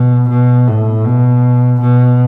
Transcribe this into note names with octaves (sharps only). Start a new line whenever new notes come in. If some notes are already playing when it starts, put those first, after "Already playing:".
Already playing: B2
B2
A2
B2
B2